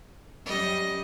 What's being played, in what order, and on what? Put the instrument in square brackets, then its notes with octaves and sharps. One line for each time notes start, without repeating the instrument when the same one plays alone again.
[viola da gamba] F#2 G3 [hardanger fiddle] D#5